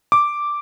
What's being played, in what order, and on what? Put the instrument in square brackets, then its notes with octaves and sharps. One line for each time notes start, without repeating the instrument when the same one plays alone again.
[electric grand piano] D6